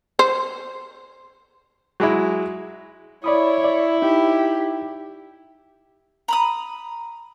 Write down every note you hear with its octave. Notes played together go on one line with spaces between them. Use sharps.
C5
F#3 G#3 E4
E4 C#5 D5 B5 D#6
D5
D#4 G4
A#5 B5 D#6